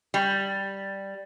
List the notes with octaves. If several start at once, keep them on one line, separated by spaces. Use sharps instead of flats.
G3